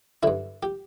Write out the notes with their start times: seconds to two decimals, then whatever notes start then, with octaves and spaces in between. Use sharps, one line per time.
0.23 G2 D3 E4
0.63 G4